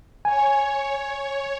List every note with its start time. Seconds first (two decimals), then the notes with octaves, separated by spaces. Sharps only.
0.25 C#5 G#5